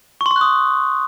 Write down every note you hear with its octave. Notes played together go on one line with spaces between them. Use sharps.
C#6
C6
C#6
F#6
D#6